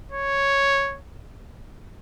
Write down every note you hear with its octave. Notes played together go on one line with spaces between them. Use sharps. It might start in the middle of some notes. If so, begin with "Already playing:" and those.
C#5